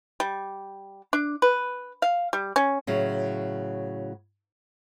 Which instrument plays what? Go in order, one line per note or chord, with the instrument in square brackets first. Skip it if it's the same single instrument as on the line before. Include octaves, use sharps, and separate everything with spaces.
[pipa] G3
D4
B4
F5
G3
C#4
[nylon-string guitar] A2 C#3 F#3